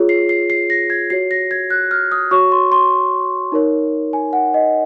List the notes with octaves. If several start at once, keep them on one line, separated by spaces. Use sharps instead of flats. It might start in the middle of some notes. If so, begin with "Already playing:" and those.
Already playing: F4 G#4 C#5
C7
C7
C7
A#6
G#6
F#4 C#5 C7
A#6
G#6
F#6
F6
D#6
F#4 C#5 C#6
C6
C6
D#4 A#4 C#5
G#5
F#5
D#5